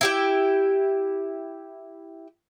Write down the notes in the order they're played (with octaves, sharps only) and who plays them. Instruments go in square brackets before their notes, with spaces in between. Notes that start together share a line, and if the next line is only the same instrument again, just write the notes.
[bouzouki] E4 G4 G5